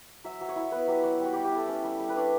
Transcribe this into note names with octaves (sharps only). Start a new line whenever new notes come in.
F#3 E5
F#3
C#5
E4
B3 B4
F#3 G4
F#3 F#4
G3 F#4
G3 G4
G4
E4 A4
C#4
G3
G3
B4
D4 C#5